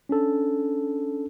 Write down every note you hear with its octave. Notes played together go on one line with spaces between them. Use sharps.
C#4 D4 A4